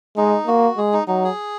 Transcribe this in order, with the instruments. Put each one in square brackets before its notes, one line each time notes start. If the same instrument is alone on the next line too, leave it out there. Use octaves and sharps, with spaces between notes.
[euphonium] G#3 [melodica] D#4
[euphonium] A#3 [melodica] F#4
[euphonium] G#3 [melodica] G#4
[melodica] D#4
[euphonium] F#3 [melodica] D#4
[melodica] G#4